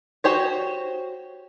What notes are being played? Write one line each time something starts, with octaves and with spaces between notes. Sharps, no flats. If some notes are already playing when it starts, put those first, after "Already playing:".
F#4 G4 C5 C#5